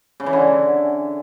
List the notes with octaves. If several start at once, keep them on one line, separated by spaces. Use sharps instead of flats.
C#3
E3
D3